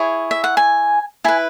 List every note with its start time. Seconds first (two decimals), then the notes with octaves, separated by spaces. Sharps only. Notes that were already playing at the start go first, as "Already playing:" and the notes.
Already playing: E4 G#4 C#5
0.31 E5
0.44 F#5
0.57 G#5
1.24 E4 B4 G#5